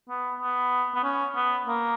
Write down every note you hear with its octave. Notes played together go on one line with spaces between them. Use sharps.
B3
B3
B3
C#4
B3
A#3